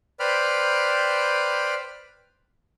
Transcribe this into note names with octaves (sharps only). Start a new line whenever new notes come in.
B4 C5 D5 G5 B5 F6